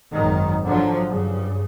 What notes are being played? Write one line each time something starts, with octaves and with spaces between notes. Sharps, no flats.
G#1 F#2 D#3
D3 F3 F#3
G2 C#3